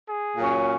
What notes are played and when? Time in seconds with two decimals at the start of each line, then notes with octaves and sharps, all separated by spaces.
0.08 G#4
0.37 A#2 F#3 C#4